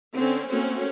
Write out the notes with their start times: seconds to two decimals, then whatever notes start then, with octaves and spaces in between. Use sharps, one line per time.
0.15 D3 C4 C#4
0.49 A3 A#3 C4 C#4 F#4